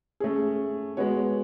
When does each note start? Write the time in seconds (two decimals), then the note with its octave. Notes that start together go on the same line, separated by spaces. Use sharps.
0.20 A3 C#4 G#4
0.97 G#3 B3 F#4 C#5